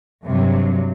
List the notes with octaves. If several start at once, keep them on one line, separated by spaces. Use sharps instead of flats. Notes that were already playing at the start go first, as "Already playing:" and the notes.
G2 C3 F#3